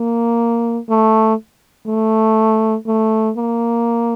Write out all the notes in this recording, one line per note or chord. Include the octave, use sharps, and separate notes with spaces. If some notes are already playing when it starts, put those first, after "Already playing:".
Already playing: A#3
A3
A3
A3
A#3